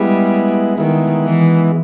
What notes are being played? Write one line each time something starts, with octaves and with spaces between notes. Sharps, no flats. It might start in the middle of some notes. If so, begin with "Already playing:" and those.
Already playing: G3 G#3 B3 E4
D#3 G#3 B3 E4
E3